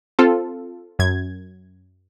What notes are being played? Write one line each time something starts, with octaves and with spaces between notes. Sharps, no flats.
C4 F4 A4
F#2 G#6